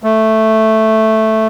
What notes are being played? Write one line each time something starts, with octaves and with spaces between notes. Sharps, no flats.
A3